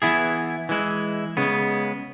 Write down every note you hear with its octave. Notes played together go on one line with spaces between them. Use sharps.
E3 B3 E4 G#4
E3 G#3 E4
C#3 G#3 B3